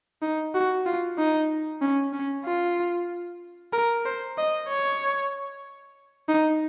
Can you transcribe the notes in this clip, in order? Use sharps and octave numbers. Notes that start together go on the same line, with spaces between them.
D#4
F#4
F4
D#4
C#4
C#4
F4
A#4
C5
D#5
C#5
D#4